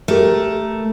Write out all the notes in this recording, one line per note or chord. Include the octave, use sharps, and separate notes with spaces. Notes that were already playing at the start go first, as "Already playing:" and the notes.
A3 G4 A#4